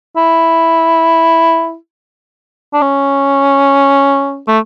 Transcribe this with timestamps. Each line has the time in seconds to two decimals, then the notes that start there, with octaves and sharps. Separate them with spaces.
0.17 E4
2.73 D4
2.82 C#4
4.48 A3